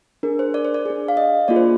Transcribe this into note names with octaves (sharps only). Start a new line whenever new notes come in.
D4 G#4 A#4
C5
D5
C5
D5
D4 G#4
F5
D#5
A#3 D4 F4 G#4 D5
C5